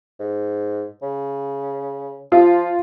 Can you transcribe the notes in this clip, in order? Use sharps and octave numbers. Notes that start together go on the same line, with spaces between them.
G#2
C#3
F3 F4